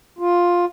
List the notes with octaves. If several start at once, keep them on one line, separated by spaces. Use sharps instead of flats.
F4